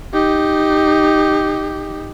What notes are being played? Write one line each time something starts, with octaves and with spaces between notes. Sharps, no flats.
D#4 G4